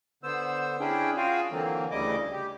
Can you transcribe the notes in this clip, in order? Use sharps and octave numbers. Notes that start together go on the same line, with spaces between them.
D3 B3 C5 E6
C#4 D4 E4 G#4 G5
F4 F#4 G#4 F5 G5 G#5
D3 E3 F#3 A#3 C4
D2 C#3 G3 E4 D#5 D6
G4